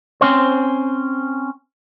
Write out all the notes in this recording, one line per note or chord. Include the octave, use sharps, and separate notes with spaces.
C4 C#4 C5